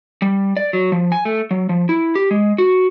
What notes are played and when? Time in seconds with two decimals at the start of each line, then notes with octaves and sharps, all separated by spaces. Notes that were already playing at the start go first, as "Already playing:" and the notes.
0.22 G3
0.57 D5
0.73 F#3
0.92 F3
1.12 G#5
1.25 A3
1.51 F#3
1.69 F3
1.89 E4
2.15 G4
2.31 G#3
2.58 F#4